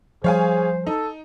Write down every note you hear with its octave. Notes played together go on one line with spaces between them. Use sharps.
F3 G3 G#4 C5 C#5 F5 G#5
D#4 A4